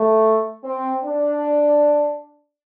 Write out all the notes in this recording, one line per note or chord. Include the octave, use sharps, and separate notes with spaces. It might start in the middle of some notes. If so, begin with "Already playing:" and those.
Already playing: A3
C4
D4